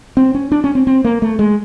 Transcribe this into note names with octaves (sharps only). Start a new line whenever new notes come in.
C4
C#4
D4
C#4
C4
C4
A#3
A3
G#3